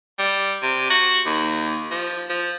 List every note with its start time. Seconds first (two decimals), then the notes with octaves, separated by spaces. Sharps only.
0.19 G3
0.62 C3
0.90 F#4
1.26 D#2
1.91 F3
2.29 F3